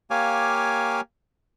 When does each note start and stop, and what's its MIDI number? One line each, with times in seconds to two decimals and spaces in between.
0.11 1.01 58
0.11 1.01 67
0.11 1.01 73
0.11 1.01 77
0.11 1.01 80
0.11 1.01 86